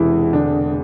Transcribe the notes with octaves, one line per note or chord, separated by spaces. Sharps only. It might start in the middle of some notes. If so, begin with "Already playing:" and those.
Already playing: E1 E2 C3 E3 G#3 E4
D3 D4